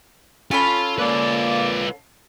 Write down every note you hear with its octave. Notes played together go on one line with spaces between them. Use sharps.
C#4 F4 A4 B5
A#3 F4 B4 D5